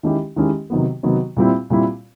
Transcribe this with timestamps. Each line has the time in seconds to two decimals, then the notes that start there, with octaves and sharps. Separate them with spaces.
0.03 D#3 G#3 C#4 E4 G4
0.36 D#3 G#3 C#4 E4 G4
0.70 C3 D#3 F#3 B3
1.03 C3 D#3 F#3 B3
1.37 A#2 G3 C4 E4
1.70 A#2 G3 C4 E4